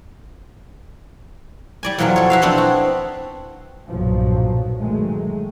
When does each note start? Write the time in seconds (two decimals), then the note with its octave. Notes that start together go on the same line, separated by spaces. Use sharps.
1.83 G3 D5 G#5
1.98 F2 B2 E3 F#3 A#3
2.16 A4 C#5
2.30 F#4 E5 F5
2.42 B3 C4 D4 E4
2.58 F#4
3.88 B1 G2 A#2 F3 F#3
4.77 D#3 F#3 G#3 A3